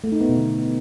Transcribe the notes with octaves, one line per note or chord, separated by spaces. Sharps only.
A3
D#4
B3
B2
D3